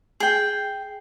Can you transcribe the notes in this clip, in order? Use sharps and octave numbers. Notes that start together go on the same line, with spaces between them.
G#4 G5